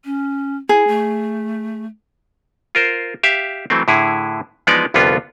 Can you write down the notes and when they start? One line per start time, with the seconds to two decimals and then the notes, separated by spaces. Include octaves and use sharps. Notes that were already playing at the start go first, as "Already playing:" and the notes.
0.05 C#4
0.69 E4 G#4
0.87 A3
2.75 F4 A#4 C5
3.23 G4 E5 F5
3.70 E3 F#3 A3 C4
3.88 A2 D3 E4 G#4
4.67 E3 F3 G#3 B3 D#4 D5
4.94 C2 F2 D3 B3 C#4 F4